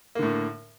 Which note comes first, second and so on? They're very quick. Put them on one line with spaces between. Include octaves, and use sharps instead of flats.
A#3 D3 A2